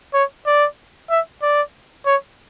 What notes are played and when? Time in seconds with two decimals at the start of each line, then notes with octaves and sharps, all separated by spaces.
0.14 C#5
0.46 D5
1.10 E5
1.42 D5
2.06 C#5